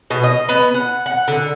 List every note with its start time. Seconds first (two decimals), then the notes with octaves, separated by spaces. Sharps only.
0.10 B2
0.23 D#5
0.49 B3
0.74 F#5
1.06 F#5
1.28 D3